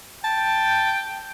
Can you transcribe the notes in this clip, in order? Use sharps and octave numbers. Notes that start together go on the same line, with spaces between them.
G5 A5